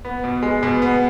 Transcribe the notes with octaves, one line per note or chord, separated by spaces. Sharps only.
B3
B2
G#3
B2
B3